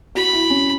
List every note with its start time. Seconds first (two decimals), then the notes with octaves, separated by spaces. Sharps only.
0.15 F#4 B5
0.33 E4
0.50 C#4